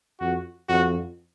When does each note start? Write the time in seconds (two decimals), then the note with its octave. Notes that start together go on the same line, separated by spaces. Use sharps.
0.20 F2 F#4
0.69 F2 F#4